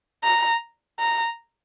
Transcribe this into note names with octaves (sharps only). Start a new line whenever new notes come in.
A#5
A#5